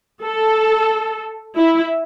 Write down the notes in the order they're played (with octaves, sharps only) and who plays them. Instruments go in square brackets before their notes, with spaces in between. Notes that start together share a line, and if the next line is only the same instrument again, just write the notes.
[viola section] A4
E4